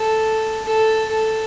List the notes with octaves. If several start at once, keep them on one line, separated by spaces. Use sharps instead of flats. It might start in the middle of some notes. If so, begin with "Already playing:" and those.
Already playing: A4
A4
A4